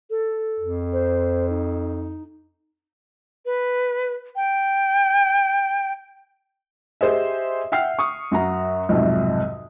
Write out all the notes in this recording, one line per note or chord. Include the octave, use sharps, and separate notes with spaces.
A4
F2
C5
D#4
B4
G5
G4 G#4 C5 D#5 E5
E5 F#5 G5 F6 C7
C#6 D#6
F#2 F#4 A#5
B1 F2 G#2 C3